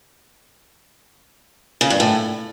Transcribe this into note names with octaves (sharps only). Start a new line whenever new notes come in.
C#3
G2
A2